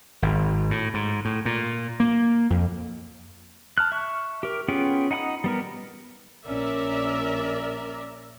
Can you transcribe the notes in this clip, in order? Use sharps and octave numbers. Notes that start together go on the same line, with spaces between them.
G#1
A2
G#2
A2
A#2
A#3
F2
A5 F6 F#6
E5 C#6
G4 A#4
B3 C#4 F4 G#4 G5
D#4 F#5 G5 B5 D#6
G3 B3 A#4
A#1 C#4 A#4 D5 E5